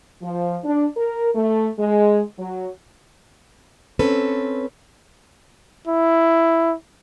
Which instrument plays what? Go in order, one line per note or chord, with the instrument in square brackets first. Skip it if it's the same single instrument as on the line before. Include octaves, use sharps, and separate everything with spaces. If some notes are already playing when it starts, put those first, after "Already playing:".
[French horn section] F3
D4
A#4
A3
G#3
F#3
[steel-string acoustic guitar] C4 C#4 A4 B4
[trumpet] E4